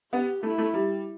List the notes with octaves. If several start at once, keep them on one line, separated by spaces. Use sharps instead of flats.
B3 G4
A3 E4
A3
G3